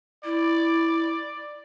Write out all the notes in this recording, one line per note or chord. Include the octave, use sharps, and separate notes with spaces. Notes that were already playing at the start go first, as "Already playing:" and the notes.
E4 D5